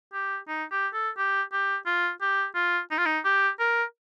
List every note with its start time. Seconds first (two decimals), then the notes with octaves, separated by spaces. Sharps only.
0.13 G4
0.48 D#4
0.71 G4
0.93 A4
1.18 G4
1.52 G4
1.86 F4
2.21 G4
2.55 F4
2.91 D#4
2.98 F4
3.06 D#4
3.24 G4
3.59 A#4